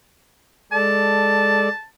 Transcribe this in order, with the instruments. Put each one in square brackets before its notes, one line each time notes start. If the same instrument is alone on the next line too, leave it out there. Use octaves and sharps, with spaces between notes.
[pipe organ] G#3 A4 D5 [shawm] A5